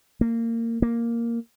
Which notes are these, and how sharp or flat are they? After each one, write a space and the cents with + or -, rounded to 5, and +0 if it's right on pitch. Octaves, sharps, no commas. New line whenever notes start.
A#3 -20
A#3 +0